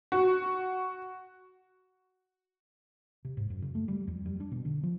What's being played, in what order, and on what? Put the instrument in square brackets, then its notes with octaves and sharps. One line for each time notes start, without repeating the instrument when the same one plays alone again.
[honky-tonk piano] F#4
[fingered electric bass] C3
G#2
F#2
C#3
A3
G3
F2
G3
D4
B2
D3
F3